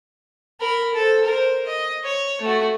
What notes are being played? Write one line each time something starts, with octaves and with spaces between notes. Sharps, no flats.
A#4 B5
A4 C5
A#4 C5
D#5
C#5
A3 F#4